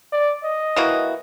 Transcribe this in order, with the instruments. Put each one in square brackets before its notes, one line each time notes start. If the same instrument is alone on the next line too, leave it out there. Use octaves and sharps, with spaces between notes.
[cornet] D5
D#5
[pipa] E3 A#3 F#4